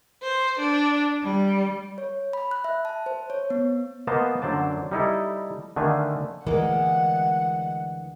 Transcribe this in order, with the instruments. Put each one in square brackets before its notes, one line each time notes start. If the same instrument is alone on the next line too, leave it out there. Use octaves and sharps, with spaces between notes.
[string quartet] C5
D4
G3
[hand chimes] C#5
B5
F#6
E5
A5
C5
C#5
B3
[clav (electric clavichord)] A#3 B3 C5 D#5 A5 A#5
F#2 D3 F#3 C5 D5 A5
G3 D#4 E4 A4
D3 D#3 A3 D4 F5 G#5
[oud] D2 G#3 A#3 [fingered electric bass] E3 [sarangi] F#5